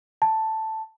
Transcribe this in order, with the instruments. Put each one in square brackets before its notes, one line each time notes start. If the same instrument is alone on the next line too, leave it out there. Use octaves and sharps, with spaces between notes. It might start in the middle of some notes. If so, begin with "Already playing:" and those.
[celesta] A5